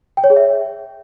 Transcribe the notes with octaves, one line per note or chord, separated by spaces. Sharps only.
G5
C#5
G#4
E5